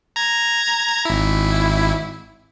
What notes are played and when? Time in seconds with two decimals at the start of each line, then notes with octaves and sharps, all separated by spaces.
0.16 A#5 G#6
1.05 G#1 E4